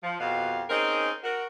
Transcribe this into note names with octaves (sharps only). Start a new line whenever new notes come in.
F3
F2 B2 G4 F5
C4 C#4 D#4 G#4 A#4
F#4 A#4